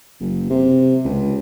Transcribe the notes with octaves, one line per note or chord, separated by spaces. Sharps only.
F#1
C3
C#2